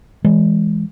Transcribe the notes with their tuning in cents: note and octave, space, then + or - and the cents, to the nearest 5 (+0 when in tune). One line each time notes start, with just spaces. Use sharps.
E3 +0 G#3 +0